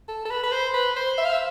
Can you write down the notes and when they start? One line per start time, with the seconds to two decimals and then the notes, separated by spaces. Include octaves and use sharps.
0.08 A4
0.25 A4
0.30 B4
0.44 B4
0.52 C5
0.74 B4
0.96 C5
1.18 E5
1.25 F5
1.33 E5